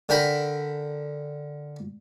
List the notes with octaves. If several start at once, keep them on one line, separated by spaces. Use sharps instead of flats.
D3 A#4 G5 B5